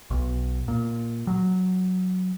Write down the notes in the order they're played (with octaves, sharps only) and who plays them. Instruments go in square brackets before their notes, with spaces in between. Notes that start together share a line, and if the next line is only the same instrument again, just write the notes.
[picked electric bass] B1
A#2
F#3